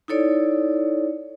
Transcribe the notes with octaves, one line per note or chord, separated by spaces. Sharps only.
D#4 E4 A4 C#5 D5